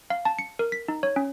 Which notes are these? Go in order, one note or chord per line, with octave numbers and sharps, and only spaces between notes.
F5
A5
C#7
A#4
B6
D#4
C#5
C#4